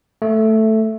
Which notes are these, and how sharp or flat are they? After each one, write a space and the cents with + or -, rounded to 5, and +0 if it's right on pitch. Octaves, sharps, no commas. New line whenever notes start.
A3 +0 A4 +0